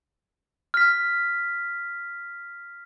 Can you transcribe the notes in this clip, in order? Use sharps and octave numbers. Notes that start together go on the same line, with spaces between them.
F6 B6